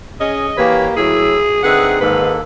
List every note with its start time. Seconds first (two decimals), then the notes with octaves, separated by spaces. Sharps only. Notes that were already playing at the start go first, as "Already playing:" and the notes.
0.20 C#4 G#4 D#5
0.57 E3 A#3 G4 B4 C#5
0.97 A2 F#3 E4 G#4 E6
1.64 D3 C4 D#4 G#4 B4 E5 F#5
2.01 G#2 D#3 A#3 A4 B4